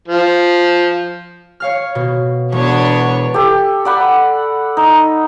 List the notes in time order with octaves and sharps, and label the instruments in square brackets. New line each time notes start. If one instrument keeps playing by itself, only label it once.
[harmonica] F3
[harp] C#5 F5 F6
B2
[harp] E1 [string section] B3 D4 C#5
[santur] G4 A4
D5 F#5 B5
D#4